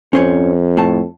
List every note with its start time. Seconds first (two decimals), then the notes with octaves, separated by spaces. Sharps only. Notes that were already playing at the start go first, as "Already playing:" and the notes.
0.13 F2 C#4 C5 C#5
0.77 A2 A5